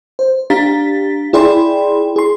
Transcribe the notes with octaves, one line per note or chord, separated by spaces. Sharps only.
C5
D4 G4 F5 A#5 A6 B6
E4 G#4 D5 G5 B5 C6
G#4 C6